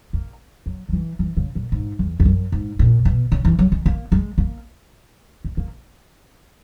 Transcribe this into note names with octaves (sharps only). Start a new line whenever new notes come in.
A#3
F#3
F#3
E3
E3
C#3
A#2
G#2
E2
E2
F#2
G#2
A#2
B2
C#3
E3
F#3
G#3
A#3
G#3
A#3
G#3
A#3